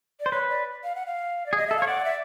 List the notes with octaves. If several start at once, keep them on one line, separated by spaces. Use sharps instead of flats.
D5
C5
B4 C#5
D5
F5
F#5
F5
D5
G#4
D#5
A4 E5
C#5 F5
D5 F#5
E5